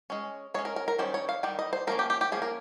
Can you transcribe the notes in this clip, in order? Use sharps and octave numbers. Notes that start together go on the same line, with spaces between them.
G#3 C#4
G#3 C#4 C#5
A#4
A#4
A#4
D#3 G3 C#4 C5
C#5
F5
D#3 G3 G5
D#5
C5
F3 A#3 C#4 A#4
G4
G4
G4
F3 A#3 C#4 G#4
A#4